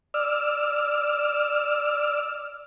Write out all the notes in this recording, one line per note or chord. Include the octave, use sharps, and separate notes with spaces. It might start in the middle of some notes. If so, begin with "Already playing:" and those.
D5 E6 F6